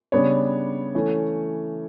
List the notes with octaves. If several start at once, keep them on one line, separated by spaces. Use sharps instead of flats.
C#3 G3 B3 D4 C#5
E3 A3 C#4